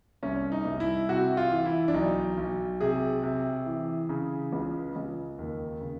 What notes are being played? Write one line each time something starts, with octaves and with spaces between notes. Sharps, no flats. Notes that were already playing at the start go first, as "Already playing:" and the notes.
C2 C#4
D#4
C2
E4
C3 F#4
F4
E3
E4
D4
B1 D#4
B1
C3 G#4
C3
E3
C#3
C#2
C#2
D#2
C#3